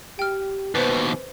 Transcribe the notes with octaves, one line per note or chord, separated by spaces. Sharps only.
G4 G5 F6
D#2 B2 B3 B4 C5